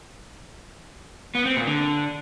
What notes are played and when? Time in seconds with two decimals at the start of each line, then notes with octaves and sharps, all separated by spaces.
1.35 B3
1.46 C4
1.56 A#2
1.67 D3